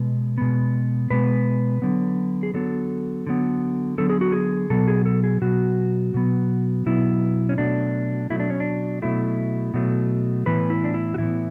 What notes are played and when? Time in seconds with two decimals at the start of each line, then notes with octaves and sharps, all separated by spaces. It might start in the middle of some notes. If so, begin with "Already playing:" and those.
Already playing: B2 G#3 B3
0.38 B2 G#3 B3
1.10 B2 G#3 B3 B4
1.82 D3 F#3 B3
2.43 G#4
2.54 D3 F#3 B3 A4
3.27 D3 F#3 B3
3.98 D3 F#3 B3 A4
4.10 G#4
4.21 F#4
4.32 G#4
4.70 B2 F#3 B3 A4
4.88 G#4
5.05 A4
5.24 G#4
5.42 B2 F#3 B3 F#4
6.14 B2 F#3 B3
6.86 B2 F#3 B3 E4
7.49 C#4
7.58 B2 F#3 A3 D4
8.30 B2 F#3 A3 E4
8.40 D4
8.50 C#4
8.60 D4
9.02 B2 F#3 A3 E4
9.74 B2 F#3 A3
10.46 A2 E3 B3 B4
10.70 E4
10.84 D4
10.94 E4
11.14 F#4
11.18 A2 E3 B3 E4